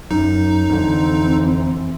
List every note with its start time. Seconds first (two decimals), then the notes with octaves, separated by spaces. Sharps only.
0.11 F#2 D#4
0.70 F2 D3 E3 C4